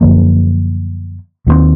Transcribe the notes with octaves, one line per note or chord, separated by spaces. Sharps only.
F#2 D3 F3 A#3
D#2 D#3 G#3 C4